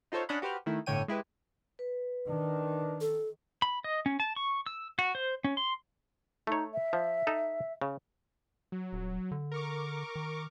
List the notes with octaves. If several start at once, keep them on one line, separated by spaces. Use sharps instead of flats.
D#4 F4 A4 C5 C#5
C#4 D4 C#5 D#5 F#5 B5
F#4 G4 B4 C5 F6
D#3 A3 E4
G1 A2 D3 C#5 G5 D#7
G#3 E4 G4 B4
B4
D#3 D4
A4
B5
D#5
C#4
A5
C#6
E6
F#4
C5
C#4
C6
A3 D#4 C#5
E5
F3
D#4 A4
C#3
F#3
D#1
D3
A#4 C#6 D6
D#3